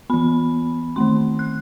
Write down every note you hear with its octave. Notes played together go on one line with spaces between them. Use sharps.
E3 B3 B5
D#3 A3 C4 C6
F#6